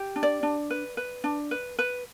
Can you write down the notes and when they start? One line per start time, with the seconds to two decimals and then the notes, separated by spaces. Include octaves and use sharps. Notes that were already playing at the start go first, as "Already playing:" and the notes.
Already playing: G4
0.16 D4
0.23 D5
0.43 D4
0.70 B4
0.97 B4
1.24 D4
1.51 B4
1.79 B4